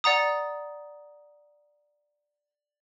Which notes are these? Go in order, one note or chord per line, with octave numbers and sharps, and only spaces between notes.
D5 F#5 A#5 D#6